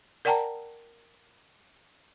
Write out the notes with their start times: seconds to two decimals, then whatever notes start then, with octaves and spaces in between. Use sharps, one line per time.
0.25 A#4 D5 F#5 G5 A5 A#5